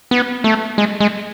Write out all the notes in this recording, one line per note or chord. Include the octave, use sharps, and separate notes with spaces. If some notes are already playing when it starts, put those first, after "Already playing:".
B3
A3
G#3
G#3